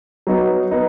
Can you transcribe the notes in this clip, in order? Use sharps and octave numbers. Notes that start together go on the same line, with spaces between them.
F#3 B3 D#4
B3 D#4